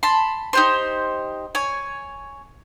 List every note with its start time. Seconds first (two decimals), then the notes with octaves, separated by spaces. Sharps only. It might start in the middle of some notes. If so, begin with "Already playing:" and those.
0.03 A5 B5 C6
0.53 D#4 G4 C5
1.55 C#5 G#5